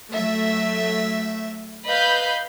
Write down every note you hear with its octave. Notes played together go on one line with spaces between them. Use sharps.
F#3 A3 E5
B4 D#5 F5 B5 G6